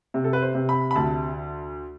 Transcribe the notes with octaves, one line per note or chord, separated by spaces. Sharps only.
C3
A4
B4
C5
C3
B5
B5
D2 A5